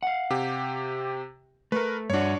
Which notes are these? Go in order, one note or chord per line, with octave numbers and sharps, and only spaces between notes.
F5 F#5
C3 G4
A3 A#4 B4
G2 D4 F#4 C#5